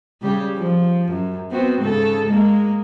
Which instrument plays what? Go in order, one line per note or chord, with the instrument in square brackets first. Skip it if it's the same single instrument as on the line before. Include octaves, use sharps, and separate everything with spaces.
[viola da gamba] C#3 G3 G4
F3
F#2
B3 C4 F#4
G#2 C#3 A4
G#3 A#3